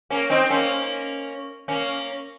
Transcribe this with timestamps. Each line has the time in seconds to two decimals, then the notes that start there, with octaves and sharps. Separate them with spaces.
0.10 A#3 C#4
0.30 C4 D#4
0.50 A#3 C#4
1.68 A#3 C#4